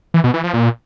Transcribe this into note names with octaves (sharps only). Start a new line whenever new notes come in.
E3
B2
E3
F3
A#2